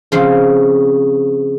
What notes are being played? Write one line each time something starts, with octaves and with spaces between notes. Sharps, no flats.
C#3 F3 C4